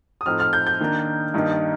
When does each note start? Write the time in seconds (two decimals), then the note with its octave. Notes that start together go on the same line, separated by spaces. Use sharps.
0.21 D#6
0.26 A2 F3 C4 D#4 F6
0.40 F6
0.53 G6
0.67 G6
0.80 D#3 A#3 D4
1.34 G2 D#3 A#3 D#4